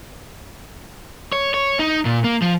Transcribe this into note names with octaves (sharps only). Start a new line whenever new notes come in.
C#5
C#5
D#4
A#2
A#3
F3